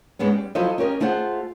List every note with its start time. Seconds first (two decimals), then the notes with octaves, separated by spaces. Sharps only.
0.19 G#2 G#3 B3 C#4
0.32 G3
0.55 F3 F#3 E4 A4 C5 D#5
0.78 C#4 G4 A#4 D#5
1.00 A3 E4 F4 G#4 C5 F#5